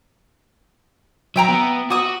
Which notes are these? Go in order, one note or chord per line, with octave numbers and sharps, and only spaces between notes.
F#3 E5 G5 A#5
B3
F#4 D6 D#6